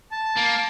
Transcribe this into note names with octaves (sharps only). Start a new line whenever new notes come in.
A5
A#3